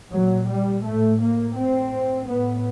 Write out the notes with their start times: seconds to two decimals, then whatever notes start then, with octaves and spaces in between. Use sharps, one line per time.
0.12 A#2 F#3
0.48 G3
0.84 A2 A3
1.21 A#3
1.57 A2 C4
2.29 A2 B3